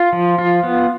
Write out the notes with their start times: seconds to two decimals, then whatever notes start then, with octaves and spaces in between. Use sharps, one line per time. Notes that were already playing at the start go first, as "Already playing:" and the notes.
Already playing: F4
0.13 F3
0.38 F4
0.63 B3